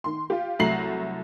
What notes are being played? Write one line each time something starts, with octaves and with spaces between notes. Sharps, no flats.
D#3 C6
F4 G4
C2 F#3 A3 A#5 C7 F#7